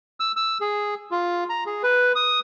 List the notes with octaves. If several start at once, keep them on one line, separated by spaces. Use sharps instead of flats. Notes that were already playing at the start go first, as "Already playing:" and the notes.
E6
E6
G#4
F4
A#5
G#4
B4
D#6